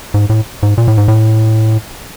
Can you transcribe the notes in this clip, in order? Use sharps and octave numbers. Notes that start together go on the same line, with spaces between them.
G#2
A2
G#2
A#2
A2
G#2
A2